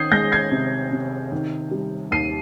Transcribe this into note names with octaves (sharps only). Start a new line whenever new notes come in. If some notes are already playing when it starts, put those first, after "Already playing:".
Already playing: D#3 D#6 G6 G#6 C7
G#3 G6 A#6
G#6 C7
C3
C3
D#3
G3
D#2 C7 D#7